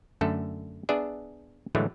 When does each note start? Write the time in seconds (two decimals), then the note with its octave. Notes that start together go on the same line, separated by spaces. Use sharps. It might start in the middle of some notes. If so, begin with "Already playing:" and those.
0.21 F#2 D3 A3 A4
0.89 B3 D4 G#4 D5 E5
1.75 A2 D3 E3 F#3 G#3 A3